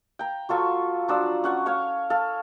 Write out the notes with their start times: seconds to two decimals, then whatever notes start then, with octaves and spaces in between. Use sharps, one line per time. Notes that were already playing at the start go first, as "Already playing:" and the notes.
0.19 G5 A#5
0.49 F#3 F4 A4 C#6
1.08 F3 F#3 D4 E6
1.44 C#4 F#5 C#6
1.66 C#5 F5 C#6
2.10 A4 F5